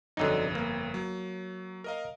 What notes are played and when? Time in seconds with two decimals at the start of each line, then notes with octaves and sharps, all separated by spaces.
0.17 G1 F2 D3 F#3 D#4
0.55 A#3
0.94 F#3
1.84 A#4 D#5 F5